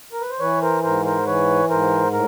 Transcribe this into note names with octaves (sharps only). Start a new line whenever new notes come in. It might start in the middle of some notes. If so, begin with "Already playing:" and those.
A#4
B4
C5
E3 B4 C#5
A#4 C5
G#2 A#4 C5
A#4 C5
E3 B4 C#5
G#2 A#4 C5
A2 A#4